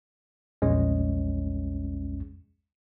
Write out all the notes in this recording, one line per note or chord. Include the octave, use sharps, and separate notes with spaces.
A#1 E2 G#3 C#4